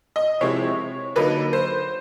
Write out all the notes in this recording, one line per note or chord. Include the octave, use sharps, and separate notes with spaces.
D#5
C3 F3 G#3 C4 E4 C#5
D3 F#3 A#3 D#4 B4
C5